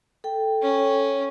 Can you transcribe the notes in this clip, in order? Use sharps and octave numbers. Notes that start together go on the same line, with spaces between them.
A4 G5
C#4